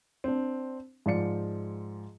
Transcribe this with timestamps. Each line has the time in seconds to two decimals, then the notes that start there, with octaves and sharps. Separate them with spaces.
0.24 C4 D4
1.06 G#2 F3 D5 C#7